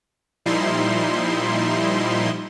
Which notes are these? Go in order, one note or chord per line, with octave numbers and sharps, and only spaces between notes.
A#2 F3 G3 D#4 E4 C6